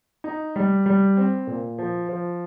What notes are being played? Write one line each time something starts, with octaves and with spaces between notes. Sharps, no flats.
D#4
G3
G3
C4
A#2
F3
F3